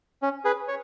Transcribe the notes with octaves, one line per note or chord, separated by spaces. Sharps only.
C#4
G#4 B4
C#5